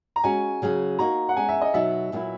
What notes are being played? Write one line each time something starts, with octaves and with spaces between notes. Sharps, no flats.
A#5
G#3 C#4 F#4 G#5
C#3 F#3 C#4 G#4
A#3 D#4 F#4 A#5
F#5
G#3 C#4 G#4 G#5
E5
D#5
B2 F#3 B3 D#4 E5
A#2 F#3 B3 E4